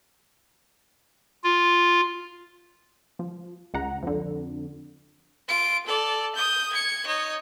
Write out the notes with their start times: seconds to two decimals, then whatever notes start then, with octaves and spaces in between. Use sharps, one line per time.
1.44 F4
3.19 F3
3.74 C#2 F#5 A#5
4.03 F2 D3
5.48 F4 D7
5.86 A4 D5
6.35 D#6 G6
6.73 G#6 C#7
7.07 D#4 C#5